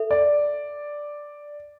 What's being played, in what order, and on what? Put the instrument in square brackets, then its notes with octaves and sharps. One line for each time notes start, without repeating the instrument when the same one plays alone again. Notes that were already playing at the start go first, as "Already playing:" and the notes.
Already playing: [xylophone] A4 E5
[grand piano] D5